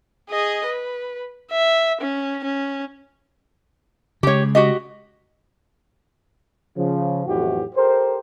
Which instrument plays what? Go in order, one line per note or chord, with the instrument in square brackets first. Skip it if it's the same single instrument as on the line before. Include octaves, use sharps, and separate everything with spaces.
[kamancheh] G#4 D#5
B4
E5
C#4
C#4
[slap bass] C#3 G#3 [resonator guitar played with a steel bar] G4 C#5
[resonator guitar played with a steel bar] F#4 G4 D#5
[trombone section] C#3 F3
B1 F2 A2 E3 F#4 G4
G4 A4 A#4 C5